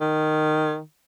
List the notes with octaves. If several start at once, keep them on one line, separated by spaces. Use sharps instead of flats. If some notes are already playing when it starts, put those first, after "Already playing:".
D#3